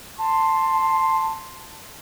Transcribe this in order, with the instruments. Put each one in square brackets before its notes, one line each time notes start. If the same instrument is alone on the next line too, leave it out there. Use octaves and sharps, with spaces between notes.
[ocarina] A5 [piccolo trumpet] C6